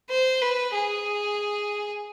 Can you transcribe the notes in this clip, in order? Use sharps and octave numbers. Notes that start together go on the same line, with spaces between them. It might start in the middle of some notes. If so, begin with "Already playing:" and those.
C5
B4
G#4